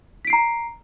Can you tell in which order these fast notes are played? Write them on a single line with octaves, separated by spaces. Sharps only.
B6 D7 C7 A#5